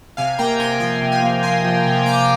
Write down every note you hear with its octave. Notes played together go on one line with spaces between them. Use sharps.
C3 F5 G#5
A#3 G5 A#5
C3 G#5 C6
F3 G#5 C6
C3
G#5 C6
A#3
C3 G#5 C6
F3
C3
A#3 A#5 D6